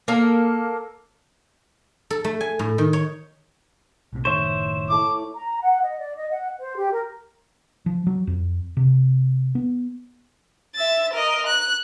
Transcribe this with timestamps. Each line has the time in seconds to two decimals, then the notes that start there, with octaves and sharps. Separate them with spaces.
0.08 A#3 A4
2.10 A4
2.24 A3
2.41 G#5
2.59 A2
2.78 D#3
2.93 C#5
4.13 B1 A2 C3
4.25 F#1 A2 D#3 C5 C#5 E5
4.90 A3 E4 D6
5.35 A#5
5.61 F#5
5.82 D#5
5.99 D5
6.17 D#5
6.31 F#5
6.59 C5
6.77 G4
6.92 A#4
7.86 F3
8.07 F#3
8.27 F2
8.77 C3
9.55 B3
10.75 E5 A6
11.13 A#4 D#5
11.46 F#6